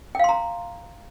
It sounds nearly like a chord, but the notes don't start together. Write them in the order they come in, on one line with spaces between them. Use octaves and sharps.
G5 F5 C6 A#5